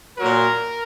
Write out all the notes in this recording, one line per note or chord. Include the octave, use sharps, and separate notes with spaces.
A#2 F#3 A#4